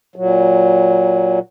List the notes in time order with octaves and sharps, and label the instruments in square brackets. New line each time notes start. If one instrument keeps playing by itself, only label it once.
[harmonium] A#2 F#3